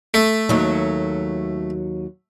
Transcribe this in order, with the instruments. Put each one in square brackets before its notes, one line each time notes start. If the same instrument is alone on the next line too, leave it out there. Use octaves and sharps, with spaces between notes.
[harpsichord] A3
[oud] D#2 F#3